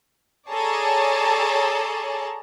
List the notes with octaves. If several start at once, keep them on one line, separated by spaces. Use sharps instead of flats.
G#4 A4 C#5 D5 A5 A#5